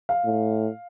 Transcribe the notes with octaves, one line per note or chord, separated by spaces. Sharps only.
F5
A2